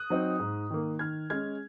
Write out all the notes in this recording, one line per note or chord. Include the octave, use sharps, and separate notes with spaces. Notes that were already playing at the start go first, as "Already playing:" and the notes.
Already playing: D#6 F#6
F#3 C4 D#4
G#2
D#3 A#3
D#3 F6 G#6
G#3 C#4 F6 G#6